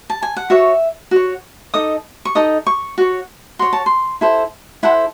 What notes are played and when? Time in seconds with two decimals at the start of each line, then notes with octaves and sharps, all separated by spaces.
0.10 A5
0.22 G#5
0.37 F#5
0.50 F#4 C#5 E5
1.11 F#4 C#5
1.74 D#4 A4 D#5 D#6
2.25 C#6
2.35 D#4 A4 D#5 D#6
2.67 C#6
2.98 F#4 C#5
3.59 F#4 C#5 C6
3.73 A5
3.86 C6
4.21 E4 A4 C5
4.83 E4 A4 C5 F#5